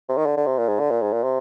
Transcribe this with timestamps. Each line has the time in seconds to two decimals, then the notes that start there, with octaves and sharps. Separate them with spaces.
0.09 C3
0.17 D#3
0.26 D3
0.37 D3
0.47 C3
0.58 A#2
0.68 G#2
0.79 D3
0.90 A#2
1.02 G#2
1.13 A#2
1.23 C3